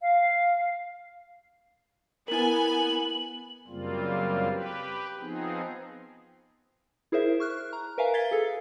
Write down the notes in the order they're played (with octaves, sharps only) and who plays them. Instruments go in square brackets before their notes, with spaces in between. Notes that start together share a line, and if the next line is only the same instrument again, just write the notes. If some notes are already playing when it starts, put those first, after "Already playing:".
[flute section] F5
[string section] B3 G#5 [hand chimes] E4 A#4 [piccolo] F#7
[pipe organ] F#2 C#3 G3 A#3 C4 F4
G4 B4
F3 B3 C4 D#4 G#4
[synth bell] E4 G#4 A#4 C5 E5
C#6 F6 F#6
A#5
A#4 B4 E5 F5 G#5 A#5
F5 G#6 A6 B6 G7
G#4 A4